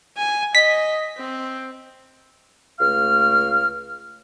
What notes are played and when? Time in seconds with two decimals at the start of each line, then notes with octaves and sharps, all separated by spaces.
0.17 G#5
0.55 D#5 B6
1.18 C4
2.80 C#2 A3 F5 F6